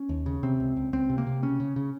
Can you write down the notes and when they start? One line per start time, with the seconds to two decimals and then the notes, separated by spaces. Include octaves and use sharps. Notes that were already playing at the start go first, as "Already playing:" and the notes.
Already playing: C#4
0.09 D#2
0.26 C#3
0.43 C3 C4
0.60 C#2
0.76 C#2
0.93 C#2 C4
1.10 C3
1.18 A#3
1.27 C3
1.43 C#3 C#4
1.60 C#3
1.76 C#3